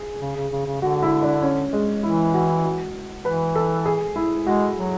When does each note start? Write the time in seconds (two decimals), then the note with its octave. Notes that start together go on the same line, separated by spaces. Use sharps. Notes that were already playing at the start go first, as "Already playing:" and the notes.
Already playing: G#4
0.21 C#3
0.36 C#3
0.52 C#3
0.66 C#3
0.82 D3 F#4
1.02 E4
1.22 D4
1.42 C#4
1.73 G#3
2.03 E3 E4
2.34 F#4
2.64 F#4
3.24 E3 B4
3.55 A4
3.86 G#4
4.16 E4
4.46 G#3 F#4
4.77 F#3